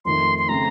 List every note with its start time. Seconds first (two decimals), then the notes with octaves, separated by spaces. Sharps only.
0.05 F2 D#3 A3 C6
0.39 C6
0.49 C#3 A3 C4 A#5